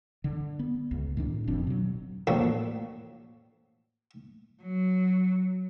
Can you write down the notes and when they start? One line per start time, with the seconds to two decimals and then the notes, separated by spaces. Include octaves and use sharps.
0.24 D3
0.59 B3
0.91 C#2
1.17 A2 D#3 D4
1.47 F1 F2 C4 D4
1.67 B2 F#3
2.27 A2 F3 A#3 D4 F#4 A4
4.63 F#3